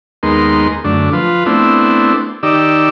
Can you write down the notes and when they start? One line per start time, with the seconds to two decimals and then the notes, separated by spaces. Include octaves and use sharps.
0.23 D#2 G#3 B3 D#4 A#4 C6
0.84 F#2 D3 A3 D4
1.13 F3 F4 B4
1.46 A3 B3 C4 D4 E4
2.43 D#3 D#4 G4 D5 E6